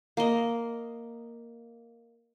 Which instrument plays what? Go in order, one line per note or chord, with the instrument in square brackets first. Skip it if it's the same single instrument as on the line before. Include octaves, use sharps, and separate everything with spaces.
[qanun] A#3 D#5